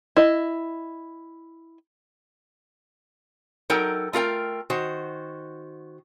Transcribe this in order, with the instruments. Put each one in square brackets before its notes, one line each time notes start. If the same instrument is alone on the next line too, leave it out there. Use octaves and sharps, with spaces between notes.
[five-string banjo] E4 D#5
[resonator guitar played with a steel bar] F#3 D#4 A4 A#4 G5
A3 F4 A#4 G5
D#3 F#4 C5